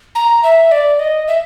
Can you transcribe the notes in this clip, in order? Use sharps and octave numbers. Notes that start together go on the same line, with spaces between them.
A#5
E5
D5
D#5
E5